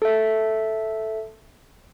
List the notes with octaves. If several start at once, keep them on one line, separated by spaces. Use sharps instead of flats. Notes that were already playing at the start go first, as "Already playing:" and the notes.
A4 E5